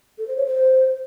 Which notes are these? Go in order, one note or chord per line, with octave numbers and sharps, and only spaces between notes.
A4
C5
C#5
C5